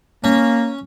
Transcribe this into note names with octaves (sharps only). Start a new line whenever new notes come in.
A#3 C#4